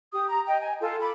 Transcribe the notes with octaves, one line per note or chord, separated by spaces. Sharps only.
G4 D#6
A#5
D#5 G5
G#5
F4 A4
B5 D6